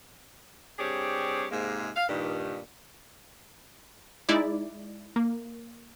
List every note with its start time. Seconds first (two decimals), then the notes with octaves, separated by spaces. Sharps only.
0.79 G2 C4 G4 G#4 C#5 D5
1.51 G#2 C3 G#3 A#3
1.96 F5
2.08 G2 A#2 D#3
4.29 G#3 D#4 E4 D5
5.16 A#3